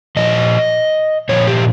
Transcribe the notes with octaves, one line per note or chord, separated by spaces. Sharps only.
A#2 F3 D#5
A#2 F3 C#5
G4